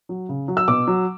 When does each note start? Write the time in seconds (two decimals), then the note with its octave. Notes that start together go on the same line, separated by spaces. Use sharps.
0.09 F#3
0.29 C#3
0.48 F#3
0.57 E6
0.68 B2 D6
0.87 F#3